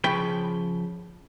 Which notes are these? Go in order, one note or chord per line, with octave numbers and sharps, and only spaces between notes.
C#3 F3 G5 B5